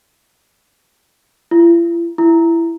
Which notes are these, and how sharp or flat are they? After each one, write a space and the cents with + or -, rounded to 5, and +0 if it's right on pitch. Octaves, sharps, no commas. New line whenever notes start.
E4 +45
E4 +15